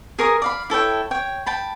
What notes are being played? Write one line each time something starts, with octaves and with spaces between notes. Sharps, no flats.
G#4 A#4 C#6 D#6
D5 F5 B5
E4 A4 C#5 G5
C#5 G5
G5 A5 B5